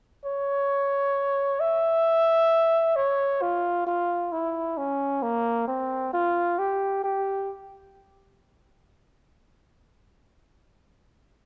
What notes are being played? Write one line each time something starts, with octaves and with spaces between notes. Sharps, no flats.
C#5
E5
C#5
F4
F4
E4
C#4
A#3
C4
F4
G4
G4